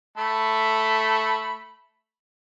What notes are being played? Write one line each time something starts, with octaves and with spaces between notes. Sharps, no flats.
A3 A4 B5